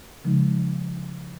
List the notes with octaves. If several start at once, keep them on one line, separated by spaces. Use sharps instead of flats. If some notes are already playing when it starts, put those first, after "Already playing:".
C#3 F3 G#3 D#4